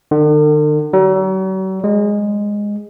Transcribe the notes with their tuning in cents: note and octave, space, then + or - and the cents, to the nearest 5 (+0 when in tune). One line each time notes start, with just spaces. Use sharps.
D3 +45
F#3 +45
G#3 -10